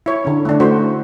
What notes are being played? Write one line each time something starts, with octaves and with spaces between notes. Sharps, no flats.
E4 C#5
D3 C#4
A3 D4
A3 E4 F#4 C5